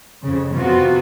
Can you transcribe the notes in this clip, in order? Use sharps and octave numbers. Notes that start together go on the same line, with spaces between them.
F2 C#3
C3 B3 F4 F#4